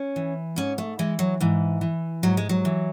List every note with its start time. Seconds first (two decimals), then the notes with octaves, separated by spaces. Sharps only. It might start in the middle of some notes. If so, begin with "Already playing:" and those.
Already playing: C#4
0.16 E3
0.56 G#2 C#4
0.78 A3
0.99 E3 G#3
1.19 F#3
1.40 G#2 E3
1.81 E3
2.23 G#2 F#3
2.37 G#3
2.49 F#3
2.65 E3